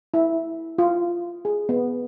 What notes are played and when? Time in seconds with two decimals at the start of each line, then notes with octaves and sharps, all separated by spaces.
0.14 E4
0.78 F4
1.45 G#4
1.69 B3